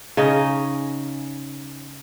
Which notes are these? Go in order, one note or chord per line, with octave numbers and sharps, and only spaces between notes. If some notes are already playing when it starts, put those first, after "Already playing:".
C#3 C#4 D#4 D#5